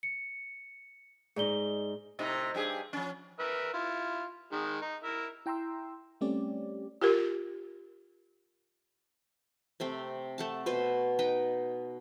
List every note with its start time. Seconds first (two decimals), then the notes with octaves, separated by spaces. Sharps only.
0.03 C#7
1.36 G#2 D#4 G#4 D5 G7
2.19 A2 C3 D#4
2.55 G2 G4 G#4
2.93 F3 C#4
3.40 A#4 B4 E5
3.73 E4 F4
4.52 D#3 G#3
4.81 D#4
5.03 E4 A#4 E5
5.46 E4 G5 A#5 C6 E6
6.21 G3 A3 C4 C#4 G4 D5
7.02 F4 G4 A#4
9.80 C3 A3 C4
10.38 A3 F#5 A5
10.66 B2 B4 C5
11.19 D#4 B4 G5